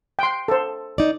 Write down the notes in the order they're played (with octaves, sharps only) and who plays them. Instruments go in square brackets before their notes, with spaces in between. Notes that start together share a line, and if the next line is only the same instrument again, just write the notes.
[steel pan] G5 C6
A4 C5
[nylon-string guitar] D#4 D5